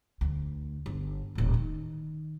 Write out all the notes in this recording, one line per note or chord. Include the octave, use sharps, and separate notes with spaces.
D2
G1
D#1 A2
D#3